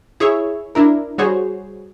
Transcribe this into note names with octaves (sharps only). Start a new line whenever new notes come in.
E4 G#4 C#5 E5
D4 E4 A#4
G3 F#4 G#4 C5 C#5